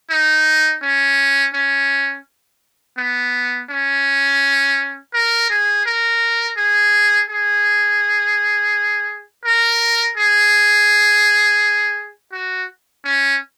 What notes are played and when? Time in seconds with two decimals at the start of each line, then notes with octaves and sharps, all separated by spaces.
0.10 D#4
0.82 C#4
1.54 C#4
2.98 B3
3.70 C#4
5.14 A#4
5.50 G#4
5.86 A#4
6.57 G#4
7.29 G#4
9.45 A#4
10.17 G#4
12.32 F#4
13.04 C#4